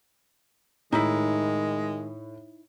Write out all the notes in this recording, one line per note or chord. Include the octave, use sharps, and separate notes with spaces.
A2 D#3 G#3 D#4 E4